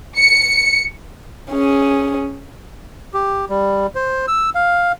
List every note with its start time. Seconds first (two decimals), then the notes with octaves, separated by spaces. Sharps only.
0.17 C#7
1.51 C#4 G#4
3.14 G4
3.50 G3
3.95 C5
4.28 E6
4.55 F5